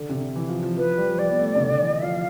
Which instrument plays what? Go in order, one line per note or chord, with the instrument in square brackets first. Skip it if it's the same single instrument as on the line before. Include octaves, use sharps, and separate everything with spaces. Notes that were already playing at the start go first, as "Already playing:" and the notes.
Already playing: [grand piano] D3
C3
D3
E3
F3
F3
[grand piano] F3 [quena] B4
[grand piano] G3
F3
[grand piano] G3 [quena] D5
[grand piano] B3
A3
C3
D3
D3
E3
[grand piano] F3 [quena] F5